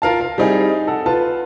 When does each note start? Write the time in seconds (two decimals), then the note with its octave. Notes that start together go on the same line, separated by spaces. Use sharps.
0.02 F4 A#4 F5 A5
0.21 F5
0.38 G3 C4 D#4 E4 G#4
0.87 A4 F#5
1.06 F4 B4 A5